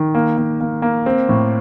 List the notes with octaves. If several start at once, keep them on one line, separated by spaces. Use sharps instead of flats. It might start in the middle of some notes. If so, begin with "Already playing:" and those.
Already playing: D#3
A#3
A#3
A#3
A#3
C4
A2